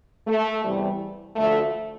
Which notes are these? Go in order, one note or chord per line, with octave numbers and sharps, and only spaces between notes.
A3
E2 C3 E3 G3
D2 D3 F3 A3